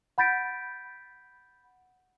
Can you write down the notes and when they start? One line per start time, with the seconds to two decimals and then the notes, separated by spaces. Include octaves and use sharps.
0.18 F#5 B5 G6 A6 B6 D7